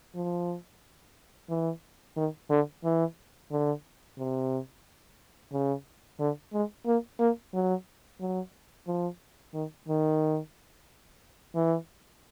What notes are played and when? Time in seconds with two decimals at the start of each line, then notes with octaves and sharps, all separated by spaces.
0.15 F3
1.50 E3
2.17 D#3
2.50 D3
2.84 E3
3.52 D3
4.18 C3
5.53 C#3
6.20 D3
6.53 G#3
6.86 A#3
7.20 A#3
7.54 F#3
8.20 F#3
8.88 F3
9.54 D#3
9.89 D#3
11.56 E3